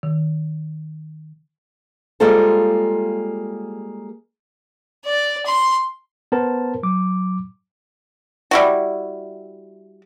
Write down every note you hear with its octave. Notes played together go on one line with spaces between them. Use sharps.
D#3
G3 G#3 A#3 F4 A4 C5
D5
C6
B3 A#4 C5 A5
F#3 D6
G3 E4 F#4